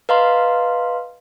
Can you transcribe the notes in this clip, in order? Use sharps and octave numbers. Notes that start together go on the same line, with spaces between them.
B4 D#5 F5 A#5 C6